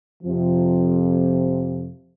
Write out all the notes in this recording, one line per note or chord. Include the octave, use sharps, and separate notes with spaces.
F2 C3 F3